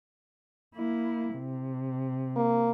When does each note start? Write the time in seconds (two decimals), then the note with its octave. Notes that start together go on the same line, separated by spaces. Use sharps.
0.75 A#3 E4
1.36 C3
2.36 A#3